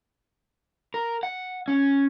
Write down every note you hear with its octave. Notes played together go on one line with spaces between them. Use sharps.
A#4
F#5
C#4